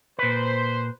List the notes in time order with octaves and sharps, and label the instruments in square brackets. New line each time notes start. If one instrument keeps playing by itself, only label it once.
[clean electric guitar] A#2 B4 [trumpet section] C5